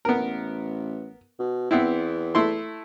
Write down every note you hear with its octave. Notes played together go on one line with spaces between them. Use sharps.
A1 B3 A#4
B2
E2 B3 C4 E4
A3 E4 C6